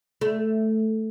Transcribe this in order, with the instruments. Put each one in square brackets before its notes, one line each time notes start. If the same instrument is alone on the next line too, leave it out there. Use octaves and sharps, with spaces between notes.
[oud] A3